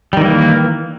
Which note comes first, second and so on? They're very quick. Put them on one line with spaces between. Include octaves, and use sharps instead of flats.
G3 D#3 E3 A#3